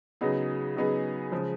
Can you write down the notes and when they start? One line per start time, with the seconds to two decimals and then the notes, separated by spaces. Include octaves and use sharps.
0.21 C#3 F#3 B3 D#4 G#4
0.76 C#3 F#3 B3 D#4 G#4
1.32 C#3 F3 G#3